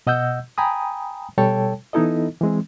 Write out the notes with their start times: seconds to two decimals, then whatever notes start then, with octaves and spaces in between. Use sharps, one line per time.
0.07 B2 D#5 F#5 E6 G6
0.58 G5 G#5 A#5 B5 D#6
1.38 B2 G3 A4 C#5 G5 A5
1.93 E3 B3 D#4 E4 A4 D#5
2.41 E3 G#3 C4